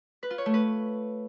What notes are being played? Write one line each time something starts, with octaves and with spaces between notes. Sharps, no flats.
B4
F4
C#5
A3
B4